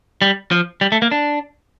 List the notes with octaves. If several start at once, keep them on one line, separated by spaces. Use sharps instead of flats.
G3
F3
G3
A3
A#3
D4